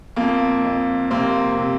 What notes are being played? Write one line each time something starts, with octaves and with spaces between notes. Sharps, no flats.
F2 A#3
F2
C3 A#3 C4
C3